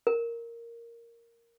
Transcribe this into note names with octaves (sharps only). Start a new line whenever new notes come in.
A#4